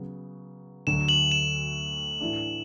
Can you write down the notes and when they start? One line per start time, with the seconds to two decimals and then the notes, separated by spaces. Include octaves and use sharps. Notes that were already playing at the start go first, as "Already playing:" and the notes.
Already playing: C#3 F#3 B3
0.87 D2 D3 F#3 E7
1.08 F#7
1.32 E7
2.21 A2 E3 A3 D4